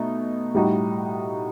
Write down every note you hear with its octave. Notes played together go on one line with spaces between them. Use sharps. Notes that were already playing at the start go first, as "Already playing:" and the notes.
Already playing: B2 A3 D#4
A2 G3 D#4 F#4